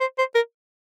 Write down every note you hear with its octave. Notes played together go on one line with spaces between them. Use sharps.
C5
C5
A#4